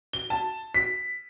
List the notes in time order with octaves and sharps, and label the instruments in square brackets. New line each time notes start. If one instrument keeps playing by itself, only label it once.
[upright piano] G7
A5
B6